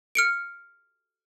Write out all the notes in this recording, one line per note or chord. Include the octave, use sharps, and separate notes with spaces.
F6 C#7 D7